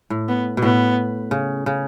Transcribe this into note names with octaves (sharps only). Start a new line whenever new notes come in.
A2
B3
B2
A2 B3
C#3
C#3